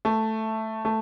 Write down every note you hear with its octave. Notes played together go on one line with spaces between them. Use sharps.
A3
A3